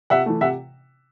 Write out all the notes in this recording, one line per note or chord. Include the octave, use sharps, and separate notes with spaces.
C3 E5 F#5
E3 A3
C3 E5 F#5